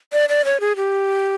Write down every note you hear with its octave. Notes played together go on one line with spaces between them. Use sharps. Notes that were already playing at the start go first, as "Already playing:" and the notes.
D5
D5
C#5
G#4
G4